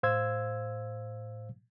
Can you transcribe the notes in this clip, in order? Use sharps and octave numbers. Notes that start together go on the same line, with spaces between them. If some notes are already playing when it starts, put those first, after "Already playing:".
A2 C5 F5 E6 G#6